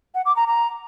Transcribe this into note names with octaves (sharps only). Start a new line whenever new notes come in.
F#5
D6
A#5
A#5